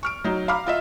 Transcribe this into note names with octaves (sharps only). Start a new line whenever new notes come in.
C#6 F6 D7
F#3 D#4
F5 A#5 B5 D6 F6
F4 D#5 E5